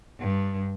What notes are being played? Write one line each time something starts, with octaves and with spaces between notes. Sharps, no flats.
G2